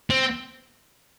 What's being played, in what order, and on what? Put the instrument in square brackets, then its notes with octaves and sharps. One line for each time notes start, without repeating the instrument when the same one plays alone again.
[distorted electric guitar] C4